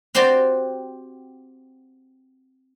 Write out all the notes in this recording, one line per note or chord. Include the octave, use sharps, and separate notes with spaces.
C4 F#4 G4 C5 D5